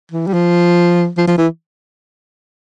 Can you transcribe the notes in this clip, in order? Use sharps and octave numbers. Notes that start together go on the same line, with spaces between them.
E3
G3
F3
F3
F3
E3